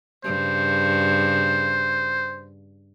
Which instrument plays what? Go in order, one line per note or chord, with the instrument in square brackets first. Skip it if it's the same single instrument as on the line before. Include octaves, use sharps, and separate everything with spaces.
[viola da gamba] G2 C#3 [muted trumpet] C5